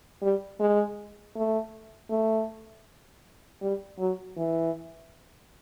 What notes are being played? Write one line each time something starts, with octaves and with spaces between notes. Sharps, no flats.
G3
G#3
A3
A3
G3
F#3
E3